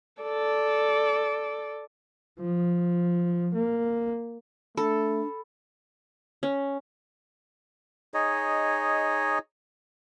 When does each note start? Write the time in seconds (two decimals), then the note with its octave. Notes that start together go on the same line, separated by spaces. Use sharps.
0.22 A4 D5
2.40 F3
3.54 A#3
4.77 A3 D4 A4 B5
6.43 C#4
8.14 D#4 G#4 C#5 D#5